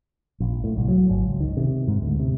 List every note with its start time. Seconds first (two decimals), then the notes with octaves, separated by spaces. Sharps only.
0.40 A#1
0.64 A2
0.77 C2
0.88 F#3
1.09 G#1
1.21 C#2
1.40 D#3
1.57 C3
1.88 G#2
2.02 D2
2.19 C3